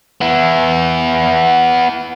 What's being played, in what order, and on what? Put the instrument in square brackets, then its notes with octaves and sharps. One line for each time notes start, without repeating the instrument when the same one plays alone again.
[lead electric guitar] B3 E4